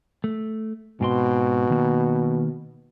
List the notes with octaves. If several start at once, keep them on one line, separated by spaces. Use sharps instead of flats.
A3
G#2 B2 C4 C6
D#3 A#3